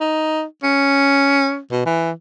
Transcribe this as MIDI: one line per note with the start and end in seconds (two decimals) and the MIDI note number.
0.01 0.43 63
0.63 1.59 61
1.71 1.85 47
1.86 2.11 52